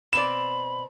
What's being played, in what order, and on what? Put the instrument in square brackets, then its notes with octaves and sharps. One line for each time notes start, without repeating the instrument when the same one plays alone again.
[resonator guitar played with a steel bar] B2 C4 D5 [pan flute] B5 [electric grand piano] E7